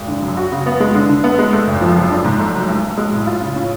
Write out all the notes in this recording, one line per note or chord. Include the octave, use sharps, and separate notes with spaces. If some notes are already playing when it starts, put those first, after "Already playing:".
Already playing: G#1 G#3
D3
F#2
F#4
C#3
B3
G#3
D3
D3
B3
G#3
A3
G#1
F3
F#2
D4
G#2
A3
F#3
B1
B1
G#3
A2
F4
C#3
C#4